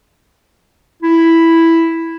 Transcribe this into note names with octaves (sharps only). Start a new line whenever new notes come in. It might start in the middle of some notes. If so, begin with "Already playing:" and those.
E4